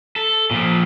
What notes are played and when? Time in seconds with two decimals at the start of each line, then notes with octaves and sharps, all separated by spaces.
0.16 A4
0.51 A#2 F3